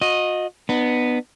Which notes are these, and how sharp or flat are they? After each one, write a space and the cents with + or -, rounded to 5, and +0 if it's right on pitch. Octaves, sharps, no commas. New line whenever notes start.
F#4 -40 D#5 +0
B3 +0 D#4 -45